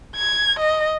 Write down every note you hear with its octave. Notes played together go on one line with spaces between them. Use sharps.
G#6
D#5